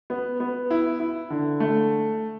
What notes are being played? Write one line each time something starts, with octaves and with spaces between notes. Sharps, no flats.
B3
B3
E4
E4
D3
A3